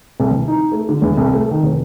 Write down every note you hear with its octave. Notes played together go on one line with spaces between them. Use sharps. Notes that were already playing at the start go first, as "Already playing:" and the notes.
C2
E3
D#4
A3
D3
E2
C2
A3
D#3
F1